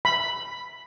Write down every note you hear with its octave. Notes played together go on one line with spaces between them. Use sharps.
B5